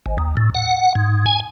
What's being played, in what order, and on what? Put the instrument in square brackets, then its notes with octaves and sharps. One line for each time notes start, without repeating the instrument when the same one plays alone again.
[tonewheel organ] G#1
D#2
A2
F#5
G#2
G#5